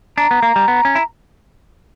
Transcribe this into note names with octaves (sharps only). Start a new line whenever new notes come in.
D4 A#5
B3
A#3
G3
B3
C#4
E4